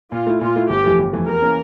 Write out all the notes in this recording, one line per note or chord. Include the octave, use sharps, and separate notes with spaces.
A#2 F4
A3 E4
A#2 F4
A3 E4
G1 G4
F2 E3 A3
G1
F2 E3 A3
E2 A#4
E3 A#3 C#4